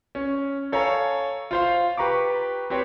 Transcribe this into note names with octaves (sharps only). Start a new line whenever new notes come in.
C#4
A4 C#5 F5 G#5 A#5
F4 C5 F5
G4 B4 A#5 C#6 D6
C4 G4 B4 C#5